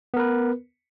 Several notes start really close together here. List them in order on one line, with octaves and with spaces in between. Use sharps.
B3 A#4 B4